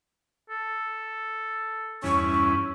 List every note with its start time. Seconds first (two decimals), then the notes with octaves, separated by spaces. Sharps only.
0.50 A4
2.03 E2 G2 C#4 E4 C#6